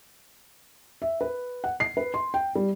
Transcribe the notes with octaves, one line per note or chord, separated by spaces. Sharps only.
E5
B4
F#5
C7
B4
C6
G5
G3